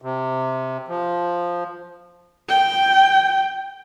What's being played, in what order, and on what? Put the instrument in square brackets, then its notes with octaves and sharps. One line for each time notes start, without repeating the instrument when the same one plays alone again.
[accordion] C3
F3
[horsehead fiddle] G5